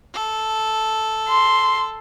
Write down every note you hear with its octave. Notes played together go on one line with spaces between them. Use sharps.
A4
C6